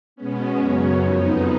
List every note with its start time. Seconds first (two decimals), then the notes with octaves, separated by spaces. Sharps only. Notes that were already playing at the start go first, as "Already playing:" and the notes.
0.16 B2 G#3 B3 C#4
0.58 F#2 C#3 F#3
1.00 F2 F3 B3 D#4